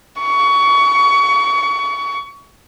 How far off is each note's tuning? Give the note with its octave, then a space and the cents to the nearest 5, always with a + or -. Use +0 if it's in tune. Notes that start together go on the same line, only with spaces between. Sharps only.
C#6 +25